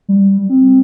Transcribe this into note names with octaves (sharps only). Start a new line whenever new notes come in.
G3
C4